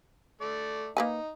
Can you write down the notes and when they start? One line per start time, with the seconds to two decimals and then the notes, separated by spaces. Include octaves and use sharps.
0.41 A3 D5
0.97 A#3 D#4 B4 G#5